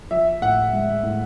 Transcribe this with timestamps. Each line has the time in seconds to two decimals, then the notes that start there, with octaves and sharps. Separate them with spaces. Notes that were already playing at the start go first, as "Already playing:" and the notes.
0.11 F3 E5
0.42 A2 F#5
0.73 G#3
1.03 A2